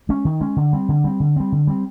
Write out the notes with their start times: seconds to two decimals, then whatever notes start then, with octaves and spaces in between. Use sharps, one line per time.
0.09 G#3 C#4
0.25 D#3
0.41 G#3 C#4
0.56 D3
0.73 G3 C4
0.89 D3
1.04 G3 C4
1.20 D3
1.36 G3 C4
1.52 D3
1.67 G3 C4